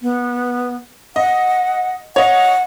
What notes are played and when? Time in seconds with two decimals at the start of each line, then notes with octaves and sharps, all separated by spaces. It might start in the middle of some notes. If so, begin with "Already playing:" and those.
0.02 B3
1.16 D#5 F#5
2.16 C#5 D#5 F#5